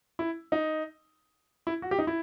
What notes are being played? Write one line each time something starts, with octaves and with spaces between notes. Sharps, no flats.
E4
D#4
E4
F#4
G4
D#4
E4